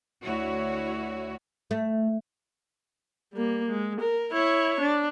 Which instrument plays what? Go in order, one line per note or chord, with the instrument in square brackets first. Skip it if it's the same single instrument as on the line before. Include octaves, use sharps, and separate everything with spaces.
[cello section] D2 E4 F#4 C#5
[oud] A3
[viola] G3 A#3
G#3
A#4
E4 C#5
D4